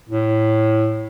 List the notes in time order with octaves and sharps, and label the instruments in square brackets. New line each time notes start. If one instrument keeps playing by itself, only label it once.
[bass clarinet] A2